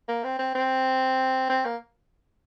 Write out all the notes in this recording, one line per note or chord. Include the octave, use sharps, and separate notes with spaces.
A#3
C4
C4
C4
C4
A#3